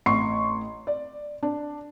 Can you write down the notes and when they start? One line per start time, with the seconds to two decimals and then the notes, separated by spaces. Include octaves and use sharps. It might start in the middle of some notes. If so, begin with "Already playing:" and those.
0.06 A1 C6 C#6 C7
0.87 D5
1.43 D4